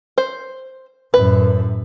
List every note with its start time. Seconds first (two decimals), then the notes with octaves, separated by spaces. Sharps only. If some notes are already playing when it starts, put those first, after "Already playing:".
0.18 C5
1.14 F#2 A2 B4